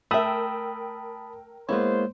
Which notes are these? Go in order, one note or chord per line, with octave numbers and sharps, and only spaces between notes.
A3 A#4 E5 G5 A5 B5 D#6 E6
G#3 A#3 B3 E4 C5 C#5